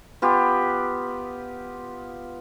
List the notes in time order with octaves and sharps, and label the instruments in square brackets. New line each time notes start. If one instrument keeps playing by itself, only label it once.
[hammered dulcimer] B3 F4 G4